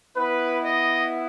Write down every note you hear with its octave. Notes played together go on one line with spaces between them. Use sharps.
B3 E4 B4
D#5